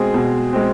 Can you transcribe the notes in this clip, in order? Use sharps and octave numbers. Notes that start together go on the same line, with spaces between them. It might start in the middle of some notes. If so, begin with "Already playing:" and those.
Already playing: B2 G#3 C4 G#4
B2
G#3 C4